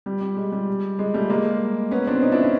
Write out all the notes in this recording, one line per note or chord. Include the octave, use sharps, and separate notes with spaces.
G3
G3
G#3
G3
G#3
G3 A3
G#3 A#3
B3 C#4
C4 D4
C#4 D#4
D4 E4
C#4 D#4